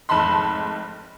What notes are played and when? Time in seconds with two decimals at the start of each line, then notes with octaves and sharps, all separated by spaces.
0.09 F1 G#2 A5 B5 C6